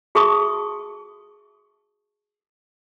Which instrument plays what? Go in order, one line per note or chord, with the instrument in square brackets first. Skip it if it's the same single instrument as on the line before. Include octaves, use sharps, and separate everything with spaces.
[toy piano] F#4 G#4 E5 A5 C#6 D#6